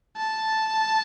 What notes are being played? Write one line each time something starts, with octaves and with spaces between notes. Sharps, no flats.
A5